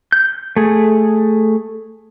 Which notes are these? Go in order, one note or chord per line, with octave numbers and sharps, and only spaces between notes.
G6
A3 G#4